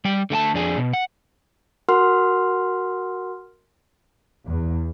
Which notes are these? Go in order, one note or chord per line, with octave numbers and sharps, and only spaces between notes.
G3 G5
D3 A3 G5 A5
F2 D4 G#4
B2
F#5
F#4 A#4 F#5 C6 F6
E2